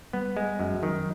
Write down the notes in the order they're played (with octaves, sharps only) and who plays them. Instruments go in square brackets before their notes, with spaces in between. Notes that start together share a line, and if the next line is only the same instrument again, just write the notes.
[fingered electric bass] G3 [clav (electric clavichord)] B3
[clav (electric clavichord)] G#3
F#2
[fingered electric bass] G3
[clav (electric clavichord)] D#3 [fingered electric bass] F#3